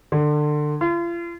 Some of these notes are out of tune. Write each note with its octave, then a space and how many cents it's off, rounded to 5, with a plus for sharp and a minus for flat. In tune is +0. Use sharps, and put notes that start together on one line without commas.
D3 +25
F4 -40